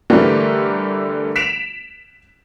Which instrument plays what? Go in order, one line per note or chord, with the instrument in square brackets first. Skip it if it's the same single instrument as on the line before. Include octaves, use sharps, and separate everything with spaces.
[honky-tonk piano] D3 E3 G3 A3 G4 A#4
B6 D7 E7 F7